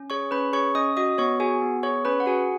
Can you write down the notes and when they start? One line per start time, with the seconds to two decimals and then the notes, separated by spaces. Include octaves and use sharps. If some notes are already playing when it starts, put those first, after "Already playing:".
Already playing: C#4
0.10 G#4 C#5 C#6
0.31 C#4 B4 B5
0.53 G#4 C#5 C#6
0.75 C#4 D#5 D#6
0.97 F#4 D#5 D#6
1.18 B3 C#5 C#6
1.40 F#4 G#4 G#5
1.62 B3
1.83 G#4 C#5 C#6
2.05 C#4 B4 B5
2.20 F#5
2.26 F#4 G#4 G#5